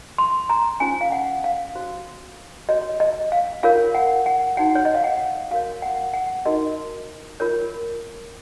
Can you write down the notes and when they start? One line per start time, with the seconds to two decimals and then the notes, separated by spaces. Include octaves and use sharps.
0.18 C6
0.49 A#5
0.80 C#4 F4 C5 G#5
1.01 F5
1.12 F#5
1.44 F5
1.75 F#4 C5
2.69 F#4 C#5 D#5
3.00 D#5
3.32 F5
3.63 F4 A#4 C#5 F5
3.95 F#5
4.26 F#5
4.57 D#4 F#4 C#5 F#5
4.75 C#5
4.85 D#5
4.95 F5
5.04 F#5
5.51 F#4 A#4 C#5 F5
5.82 F#5
6.14 F#5
6.46 D#4 F#4 A#4 D#5
7.40 F4 A#4 C#5